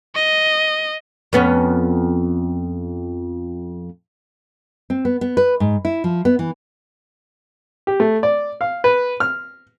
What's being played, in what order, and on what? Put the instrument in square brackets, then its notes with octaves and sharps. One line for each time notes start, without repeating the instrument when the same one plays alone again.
[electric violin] D#5
[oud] F2 B3 C#4
[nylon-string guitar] C4
B3
B3
B4
G#2
E4
F3
B3
E3
[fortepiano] G4
A3
D5
F5
B4
F6